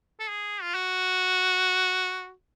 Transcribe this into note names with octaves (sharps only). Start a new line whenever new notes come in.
A4
G#4
F4
F#4